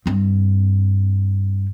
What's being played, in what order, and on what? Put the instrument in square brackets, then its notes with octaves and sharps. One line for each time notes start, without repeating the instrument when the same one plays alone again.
[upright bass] G2 C4